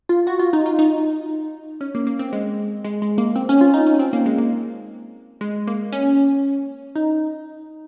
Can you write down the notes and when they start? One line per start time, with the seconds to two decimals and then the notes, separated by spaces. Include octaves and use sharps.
0.09 F4
0.27 F#4
0.39 F4
0.53 D#4
0.66 F4
0.79 D#4
1.81 C#4
1.95 A#3
2.07 A#3
2.19 C4
2.33 G#3
2.84 G#3
3.02 G#3
3.18 A#3
3.36 C4
3.49 C#4
3.61 F4
3.74 D#4
3.86 C#4
3.99 C4
4.13 A#3
4.26 G#3
4.38 A#3
5.41 G#3
5.67 A#3
5.92 C#4
6.96 D#4